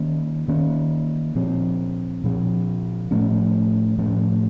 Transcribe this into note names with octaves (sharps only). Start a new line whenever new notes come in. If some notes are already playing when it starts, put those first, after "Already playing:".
Already playing: D#3 A#3 C#4
D#3 A#3 C#4
A#2 F3 C4
A#2 F3 C4
A2 F3 A3 C#4
A2 F3 A3 C#4